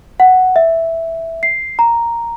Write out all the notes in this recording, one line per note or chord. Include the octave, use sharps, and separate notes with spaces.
F#5
E5
C7
A#5